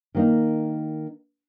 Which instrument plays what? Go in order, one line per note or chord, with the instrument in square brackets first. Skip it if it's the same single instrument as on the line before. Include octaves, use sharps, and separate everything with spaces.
[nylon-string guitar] D#3 A#3 D#4